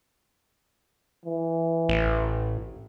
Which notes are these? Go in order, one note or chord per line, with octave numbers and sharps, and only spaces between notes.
E3
A1